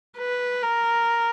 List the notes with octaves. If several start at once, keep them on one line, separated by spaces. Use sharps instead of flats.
B4
A#4